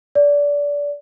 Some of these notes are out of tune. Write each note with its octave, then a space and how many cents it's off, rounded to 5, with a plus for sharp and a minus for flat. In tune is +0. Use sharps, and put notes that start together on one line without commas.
D5 -25